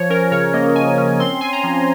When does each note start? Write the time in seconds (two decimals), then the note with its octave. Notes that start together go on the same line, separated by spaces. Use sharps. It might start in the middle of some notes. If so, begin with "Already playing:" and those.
Already playing: F3 C#5
0.10 C#4 A#4
0.31 C#3 C#5
0.53 A#3 D#5
0.75 F3 G#5
0.98 C#4
1.19 C4 C6
1.41 C4 G#5
1.53 A#5
1.63 F3